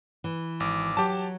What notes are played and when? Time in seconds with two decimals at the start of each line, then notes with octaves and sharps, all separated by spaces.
0.24 E3
0.60 G#1 D6
0.97 F#3 G4 A5